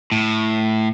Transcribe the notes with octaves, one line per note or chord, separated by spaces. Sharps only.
A2